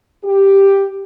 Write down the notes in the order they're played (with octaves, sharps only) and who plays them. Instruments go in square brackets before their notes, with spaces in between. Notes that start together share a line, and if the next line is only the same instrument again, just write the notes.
[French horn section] G4